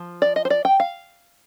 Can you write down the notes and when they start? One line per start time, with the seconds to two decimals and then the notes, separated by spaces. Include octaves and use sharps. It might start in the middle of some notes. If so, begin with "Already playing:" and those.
Already playing: F3
0.22 D5
0.36 D#5
0.45 C5
0.50 D5
0.65 G5
0.80 F5